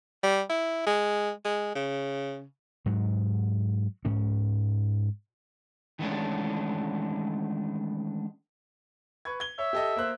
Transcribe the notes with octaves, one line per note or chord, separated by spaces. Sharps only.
G3
E4
G#3
G#3
C#3
G#2 F#3
G#2 C#4
D#3 E3 G#3 A3 C#4 D4
B4 C#6 G#6
G#6 G7
C#5 E5
G4 A4 D#5
A#3 C5 F#6